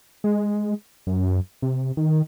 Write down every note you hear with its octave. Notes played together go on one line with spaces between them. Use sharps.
G#3
F#2
C3
D#3